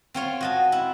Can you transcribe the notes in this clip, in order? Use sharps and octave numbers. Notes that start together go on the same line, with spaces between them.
C4 F4 C#5
F#4 D#5 A5
E4